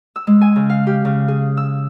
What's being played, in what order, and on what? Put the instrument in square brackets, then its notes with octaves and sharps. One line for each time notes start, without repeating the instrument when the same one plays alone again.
[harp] E6
G#3
G#5
C#3
F5
G4
C#3
G#4
E6